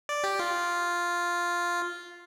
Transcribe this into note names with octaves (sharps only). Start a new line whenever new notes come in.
D5
G4
F4